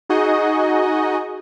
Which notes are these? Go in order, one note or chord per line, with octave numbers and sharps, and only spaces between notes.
D#4 F#4 G#4 D#5